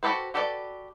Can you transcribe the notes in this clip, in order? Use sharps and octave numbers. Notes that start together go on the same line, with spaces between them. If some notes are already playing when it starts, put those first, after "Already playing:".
F#4 G4 A4 B4 C5
F#4 G4 A4 B4 D5